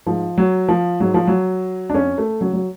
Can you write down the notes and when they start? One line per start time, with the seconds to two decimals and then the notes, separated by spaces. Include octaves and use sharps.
0.06 G#2 F3
0.38 F#3
0.68 F3
1.00 G#2 F#3
1.14 F3
1.27 F#3
1.90 D4
1.94 F2 C#4
2.18 A3
2.41 C#3 F#3
2.53 F#3